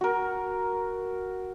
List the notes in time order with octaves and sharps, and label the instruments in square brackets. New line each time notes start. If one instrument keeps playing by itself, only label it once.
[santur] F#4 A#4